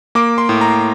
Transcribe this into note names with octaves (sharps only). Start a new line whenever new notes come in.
A#3 D6
C6
A2
A#5